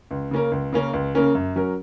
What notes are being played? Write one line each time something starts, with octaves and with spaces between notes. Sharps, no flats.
C#2
C#3 A#3 C#4 A#4
C#2
C#3 A#3 C#4 A#4
C#2
C#3 A#3 C#4 A#4
F#2
F#3 C#4 A#4